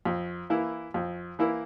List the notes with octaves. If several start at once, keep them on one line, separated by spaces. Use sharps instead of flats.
F2
E3 A#3 E4
F2
E3 A#3 E4